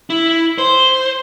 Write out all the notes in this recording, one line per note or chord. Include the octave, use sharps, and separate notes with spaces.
E4
C5